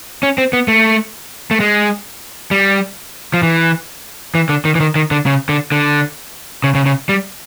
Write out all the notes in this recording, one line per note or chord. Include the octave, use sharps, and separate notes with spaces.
C#4
C4
B3
A3
A3
G#3
G3
F3
E3
E3
D3
D#3
E3
D#3
D#3
D3
C#3
D3
D3
C#3
C#3
C#3
G3